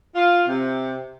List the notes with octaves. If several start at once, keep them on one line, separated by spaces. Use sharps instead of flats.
F4
C3